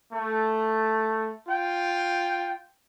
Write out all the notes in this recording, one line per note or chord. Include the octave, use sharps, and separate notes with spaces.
A3
F4 G5